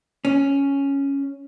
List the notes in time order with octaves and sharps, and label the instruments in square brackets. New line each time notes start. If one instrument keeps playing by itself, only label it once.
[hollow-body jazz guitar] C#4